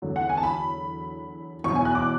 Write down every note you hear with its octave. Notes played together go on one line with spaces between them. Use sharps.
E2 D3 F#3
F#5
G#5
A5
B5
E2 B2 F#3 C#6
G#5
F#6
D6